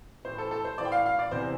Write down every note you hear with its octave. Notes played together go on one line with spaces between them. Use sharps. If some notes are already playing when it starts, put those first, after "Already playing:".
A2 E3 C5
A4
A4
C5
A2 E3 D5
G5
F5
F5
D5
E2 C3 E3 C5